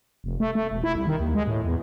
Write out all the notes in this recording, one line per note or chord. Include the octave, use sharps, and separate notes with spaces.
F1
A3
A3
E1
E4
C2
D#3
D#2
G#3
A2
E2